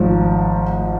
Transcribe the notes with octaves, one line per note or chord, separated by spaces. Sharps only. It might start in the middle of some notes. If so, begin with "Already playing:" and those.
Already playing: G#1 G#2 F3